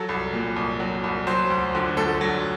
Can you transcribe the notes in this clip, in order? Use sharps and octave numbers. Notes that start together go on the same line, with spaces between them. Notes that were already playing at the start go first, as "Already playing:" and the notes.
Already playing: F#3 A4
C2
A#2
C2
F#3
C2
F#3 C5
D2
D3
D2 A4
F#3